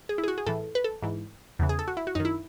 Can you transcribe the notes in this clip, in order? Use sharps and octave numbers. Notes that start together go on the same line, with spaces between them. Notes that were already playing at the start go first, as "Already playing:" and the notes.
G#4
E4
G#4
F#4
G#4
A2 E3 A4
B4
A4
G#2 E3
E2 C#3 E3
G#4
A4
F#4
E4
F#4
F#2 D#3 D#4
E4